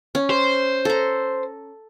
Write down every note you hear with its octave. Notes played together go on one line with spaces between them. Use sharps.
C#4
C5
A4 A#5